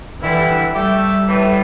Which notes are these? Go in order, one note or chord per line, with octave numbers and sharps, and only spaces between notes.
G2 D3 E3 G3 E4
G3 A3 G4 E5
A2 E3 A3